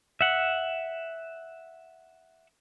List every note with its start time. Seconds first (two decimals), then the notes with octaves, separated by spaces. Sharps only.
0.21 E5 F#5